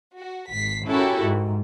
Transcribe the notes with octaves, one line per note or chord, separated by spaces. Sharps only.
F#4
G#1 B6 C7
C#4 E4 F#4 G4 A4 A#4
G#2